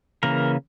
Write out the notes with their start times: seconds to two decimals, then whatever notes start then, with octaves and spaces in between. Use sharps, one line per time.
0.23 C#3 E3 A#3 A#4